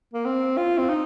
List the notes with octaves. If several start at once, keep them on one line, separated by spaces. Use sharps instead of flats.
A#3
C4
F4
C4
D#4